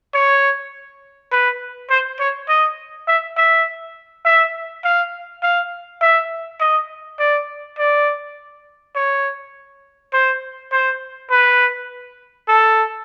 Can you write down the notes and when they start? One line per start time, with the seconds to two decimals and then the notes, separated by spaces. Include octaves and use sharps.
0.14 C#5
1.32 B4
1.90 C5
2.20 C#5
2.49 D#5
3.08 E5
3.37 E5
4.25 E5
4.84 F5
5.43 F5
6.01 E5
6.60 D#5
7.19 D5
7.78 D5
8.95 C#5
10.13 C5
10.72 C5
11.31 B4
12.48 A4